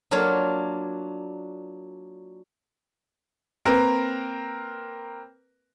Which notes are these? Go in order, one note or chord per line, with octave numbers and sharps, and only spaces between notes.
F#3 A#3 D4 F4 C#5
A#3 C4 A#4 B4